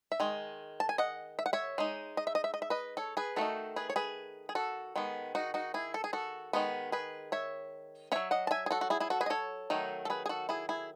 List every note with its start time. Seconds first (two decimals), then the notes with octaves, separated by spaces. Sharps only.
0.12 E5
0.20 D#3 G#3
0.80 A5
0.89 G#5
0.98 D#5 F#5
1.39 E5
1.46 F#5
1.53 C#5 E5
1.78 G#3 D#4
2.17 D#5
2.27 E5
2.35 D#5
2.44 E5
2.54 D#5
2.62 E5
2.70 B4 D#5
2.97 A4 C#5
3.17 G#4 B4
3.36 D#3 A3 D#4 F#4 A4
3.76 G#4 B4
3.90 C#5
3.96 G#4 B4
4.49 G#4
4.55 F#4 A4
4.96 D#3 G#3 B3
5.35 D#4 F#4
5.54 D#4 F#4
5.74 E4 G#4
5.94 A4
6.04 G#4
6.13 F#4 A4
6.53 D#3 G#3 B3
6.92 G#4 B4
7.32 C#5 E5
8.12 F#3 C#4 C#5 E5
8.31 D#5 F#5
8.47 A5
8.51 E5 G#5
8.66 G#4
8.71 F#4 A4
8.81 F#4
8.90 E4 G#4
9.00 E4 G#4
9.10 F#4 A4
9.21 G#4 B4
9.26 D#5
9.30 A4 C#5
9.70 D#3 F#3 A3 D#4
10.05 A4
10.10 G#4 B4
10.26 G#4
10.29 F#4 A4
10.49 E4 G#4
10.69 E4 G#4